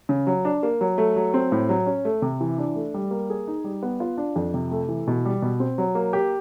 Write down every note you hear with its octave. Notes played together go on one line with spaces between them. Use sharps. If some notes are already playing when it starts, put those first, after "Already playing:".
C#3
F#3
D4
A#3
F#3
A3
F#3
C4
A2
F#3
C#4
A3
C3
E3
D4
A3
G3
A#3
G#4
D#4
G3
B3
F4
D4
F2
C3
A3
E3
B2
G3
B2
C4
F#3
A#3
G4